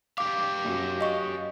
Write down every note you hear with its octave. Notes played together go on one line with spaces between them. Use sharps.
G4 F5 D6
F#2
D#5 C#6